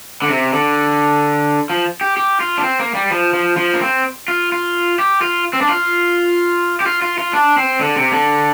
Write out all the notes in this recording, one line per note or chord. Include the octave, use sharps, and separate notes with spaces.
D3
C3
D3
F3
G4
G4
F4
D4
C4
A#3
G3
F3
F3
F3
A#3
C4
F4
F4
G4
F4
C4
D4
F4
G4
F4
F4
F4
D4
C4
D3
C3
D3